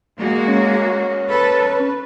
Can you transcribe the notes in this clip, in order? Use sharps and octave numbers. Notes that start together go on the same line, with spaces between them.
G#3 A#3 F#4
C#4
A4 B4
B4